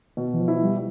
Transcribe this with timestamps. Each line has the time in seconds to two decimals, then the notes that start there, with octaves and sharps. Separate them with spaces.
0.17 B2
0.34 E3
0.40 F3
0.48 E4
0.63 G3